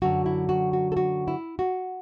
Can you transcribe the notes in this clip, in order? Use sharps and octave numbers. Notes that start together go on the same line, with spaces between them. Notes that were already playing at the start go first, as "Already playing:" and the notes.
F#2 D3 F#3 F#4
E4
F#4
F#4
A4
F#4
E4
F#4